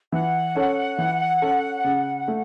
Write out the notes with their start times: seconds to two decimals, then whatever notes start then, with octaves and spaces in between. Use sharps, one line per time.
0.12 E3 F#5
0.55 C#4 A4 C#5
0.98 E3
1.42 C#4 A4 C#5
1.84 C#3
2.28 A3